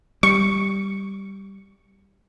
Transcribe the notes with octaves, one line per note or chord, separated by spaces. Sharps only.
G3 C#6